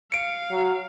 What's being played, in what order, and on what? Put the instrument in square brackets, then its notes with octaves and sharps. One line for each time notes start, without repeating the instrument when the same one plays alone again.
[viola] F5 [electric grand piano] C#7 D7
[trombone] F#3